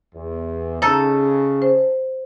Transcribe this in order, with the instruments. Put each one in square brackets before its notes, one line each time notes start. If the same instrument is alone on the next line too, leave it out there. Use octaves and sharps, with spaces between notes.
[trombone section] E2
[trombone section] C#3 [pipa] D#4 A4
[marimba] C5